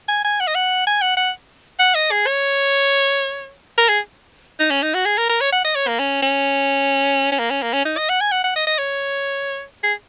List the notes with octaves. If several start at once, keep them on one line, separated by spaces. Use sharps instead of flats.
G#5
G#5
F#5
D#5
F#5
G#5
F#5
F#5
F#5
D#5
G#4
C#5
A#4
G#4
D#4
C#4
D#4
F#4
G#4
A#4
A#4
C#5
F#5
D#5
C#5
A#3
C#4
C#4
C#4
A#3
C#4
A#3
C#4
D#4
D#5
F#5
G#5
F#5
F#5
D#5
D#5
C#5
G#4